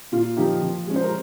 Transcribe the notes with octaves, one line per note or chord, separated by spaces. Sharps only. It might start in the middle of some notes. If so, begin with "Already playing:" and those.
A#2 F4
F3 A#3 D#4 G4
F3
G#3 C#4
C5
A#4